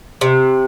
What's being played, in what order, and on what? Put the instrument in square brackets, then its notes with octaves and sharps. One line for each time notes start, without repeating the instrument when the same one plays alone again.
[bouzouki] C3